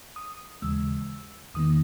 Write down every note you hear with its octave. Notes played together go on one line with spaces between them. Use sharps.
D#6
D#2 C#3 E3 G#3 E6
E2 D#3 A#3 D#6